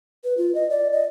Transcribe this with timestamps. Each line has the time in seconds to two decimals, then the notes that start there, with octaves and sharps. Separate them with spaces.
0.24 B4
0.37 F4
0.55 D#5
0.70 D5
0.93 D#5